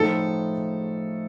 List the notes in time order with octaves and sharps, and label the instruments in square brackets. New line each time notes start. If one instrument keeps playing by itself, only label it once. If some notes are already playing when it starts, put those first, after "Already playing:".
Already playing: [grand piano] A2 F3 A3 D#4 [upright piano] A4